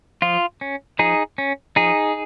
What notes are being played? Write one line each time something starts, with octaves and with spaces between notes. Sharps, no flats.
F3 F4
C#4
F3 D#4 G#4
C#4
F3 D#4 G#4